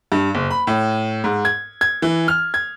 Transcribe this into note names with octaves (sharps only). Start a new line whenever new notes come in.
G2
F#1
B5
A2
G#2
G#6
G#6
E3
F6
G#6